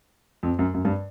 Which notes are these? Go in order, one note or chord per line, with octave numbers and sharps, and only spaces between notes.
F2
F#2
F#2
G2